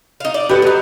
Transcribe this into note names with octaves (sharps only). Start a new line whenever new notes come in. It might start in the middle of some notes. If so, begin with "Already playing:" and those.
D#4 F5
D5
B3 G4 A4 B4
F#3 D#4